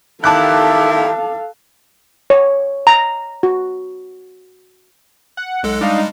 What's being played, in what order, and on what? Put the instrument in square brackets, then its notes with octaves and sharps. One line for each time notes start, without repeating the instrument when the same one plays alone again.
[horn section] D#3 E4 G4 [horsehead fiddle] A4 F5 [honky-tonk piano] A5 D6 F#6
[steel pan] C#5
A#5
F#4
[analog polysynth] F#5
[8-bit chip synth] B1 G#3 A4
[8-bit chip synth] G3 G#3 [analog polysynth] D4 D#4 F5